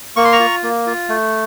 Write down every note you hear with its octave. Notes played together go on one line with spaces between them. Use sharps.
A#3 C#6
C6
A#5 C#6
F4
A#3
F4
A3